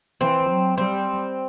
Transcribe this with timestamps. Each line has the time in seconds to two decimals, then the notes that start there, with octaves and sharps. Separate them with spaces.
0.21 E3 C4
0.49 F#3
0.77 G3 C4